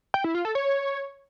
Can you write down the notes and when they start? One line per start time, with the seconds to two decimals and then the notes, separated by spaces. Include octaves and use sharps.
0.14 G5
0.24 E4
0.35 F4
0.45 A4
0.55 C#5